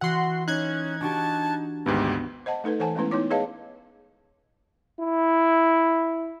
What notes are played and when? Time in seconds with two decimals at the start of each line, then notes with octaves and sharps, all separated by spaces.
0.01 E3 F#4 F#5 C6
0.48 C#4 D#4 F#6 G#6
1.01 D4 F#4 G4 A5
1.86 G#1 D2 G#2 B3 G4
2.46 C5 D#5 F#5 A5
2.64 A3 D#4 A4 B4
2.79 E3 A4 C5 F#5 G#5 A5
2.95 G#3 A3 B3 C#4 E4 B4
3.11 B3 D#4 E4 C#5 D6
3.30 G#4 B4 C#5 D#5 F5 A5
5.00 E4